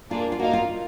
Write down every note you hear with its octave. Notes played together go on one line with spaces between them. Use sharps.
A#3 D4 F4 G#4
F4
A#3 D#4 F#4 A#4 F5
F4